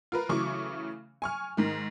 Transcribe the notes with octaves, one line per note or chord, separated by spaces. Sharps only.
F4 A#4 B4
C#3 E3 F#3 A3 C#6 D6
G#5 C#6 F6
G#2 D#3